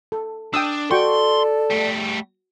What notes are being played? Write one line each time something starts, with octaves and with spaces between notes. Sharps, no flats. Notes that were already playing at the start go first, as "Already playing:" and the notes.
A4
D4 G5 D#6 E6
F#4 A4 D5 G5 C6 C#6
G3 A3